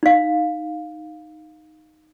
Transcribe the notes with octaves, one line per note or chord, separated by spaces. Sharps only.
D#4 F5